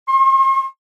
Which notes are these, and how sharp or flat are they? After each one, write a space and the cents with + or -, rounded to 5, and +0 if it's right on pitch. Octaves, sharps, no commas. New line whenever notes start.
C6 +45